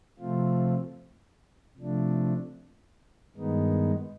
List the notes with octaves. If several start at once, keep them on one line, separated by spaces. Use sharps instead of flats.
C3 F3 A3 C4 F4
C3 F3 A3 D4
G2 D#3 G#3 B3 D#4